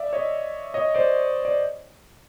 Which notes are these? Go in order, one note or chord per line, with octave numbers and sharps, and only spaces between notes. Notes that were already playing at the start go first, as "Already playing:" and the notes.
Already playing: D5 E5
C#5 D#5
C#5 D#5
C5 D5
D5